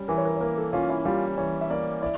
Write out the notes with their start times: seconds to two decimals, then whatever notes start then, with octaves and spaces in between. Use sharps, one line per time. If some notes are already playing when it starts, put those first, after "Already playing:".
Already playing: G3 C#4
0.08 E3 A#4
0.18 C#5
0.25 A#4
0.36 C#5
0.40 A#3 A#4
0.57 A4
0.73 C#4 F4
0.90 E4
1.05 G3 F4
1.37 E3 C#5
1.61 E5
1.70 A#3 D5
2.02 E4 D5